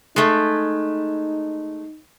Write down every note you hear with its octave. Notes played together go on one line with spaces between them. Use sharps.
G#3 A3 D#4